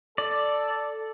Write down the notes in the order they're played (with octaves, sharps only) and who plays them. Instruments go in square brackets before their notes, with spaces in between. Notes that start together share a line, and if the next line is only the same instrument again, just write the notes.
[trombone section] A4 [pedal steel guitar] D5